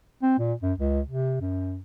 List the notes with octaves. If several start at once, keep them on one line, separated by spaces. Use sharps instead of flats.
C4
A#2
F#2
C#2
C3
F#2